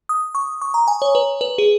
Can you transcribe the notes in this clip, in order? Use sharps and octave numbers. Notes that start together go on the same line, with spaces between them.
D#6
C#6
C#6
A#5
G#5
C#5
B4
B4
G#4